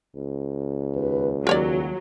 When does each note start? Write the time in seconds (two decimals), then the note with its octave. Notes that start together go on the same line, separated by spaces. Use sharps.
0.16 C#2
0.95 D#2 B4
1.47 D#2 F#3 A#4 C#5 D5